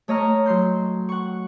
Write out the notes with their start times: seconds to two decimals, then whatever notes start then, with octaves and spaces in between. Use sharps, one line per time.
0.08 A3 C#5 D#5 A#5 F6
0.46 F#3 C6 G6
1.09 F#5 C#6